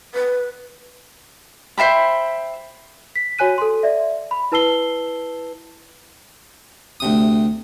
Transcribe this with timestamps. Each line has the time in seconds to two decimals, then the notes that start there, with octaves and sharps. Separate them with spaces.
0.14 B4
1.78 C5 E5 G5 B5
3.16 B6
3.39 F#4 C#5 G#5 F#6 D#7
3.58 A4 C6
3.83 D5 E5
4.31 B5
4.52 E4 B4 A5 E6 C7 G7
7.00 D2 C3 D#6